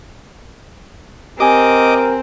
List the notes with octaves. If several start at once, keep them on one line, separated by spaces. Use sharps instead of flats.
C4 G4 A#4 D#5 G#5 D6